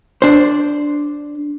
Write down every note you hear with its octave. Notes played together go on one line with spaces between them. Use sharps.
D4 C5